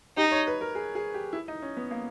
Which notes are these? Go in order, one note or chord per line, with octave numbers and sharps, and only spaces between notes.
D#4 G4
C#5
B4
A#4
G#4
G#4
G4
E4
D#4
C#4
B3
A#3